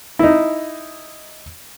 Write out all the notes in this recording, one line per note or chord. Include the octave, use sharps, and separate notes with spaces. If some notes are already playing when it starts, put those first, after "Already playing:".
D#4 E4